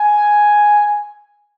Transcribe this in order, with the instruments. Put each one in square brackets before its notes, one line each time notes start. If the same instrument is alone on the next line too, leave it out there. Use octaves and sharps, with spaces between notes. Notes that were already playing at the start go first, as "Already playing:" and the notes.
Already playing: [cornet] G#5